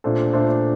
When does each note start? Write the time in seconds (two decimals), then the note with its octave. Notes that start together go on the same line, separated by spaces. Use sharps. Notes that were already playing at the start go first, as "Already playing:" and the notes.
0.04 A#2 A3 D4 A4 C5
0.33 A#2 A3 D4 A4 C5